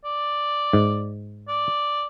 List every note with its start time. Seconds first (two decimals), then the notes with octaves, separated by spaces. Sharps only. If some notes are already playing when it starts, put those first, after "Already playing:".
0.05 D5
0.73 G#2
1.48 D5